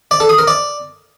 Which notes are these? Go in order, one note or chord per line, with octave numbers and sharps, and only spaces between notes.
D5
A4
D#6
A#4
D5